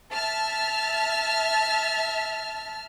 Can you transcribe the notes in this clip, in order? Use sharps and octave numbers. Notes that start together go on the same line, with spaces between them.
E5 A5 F6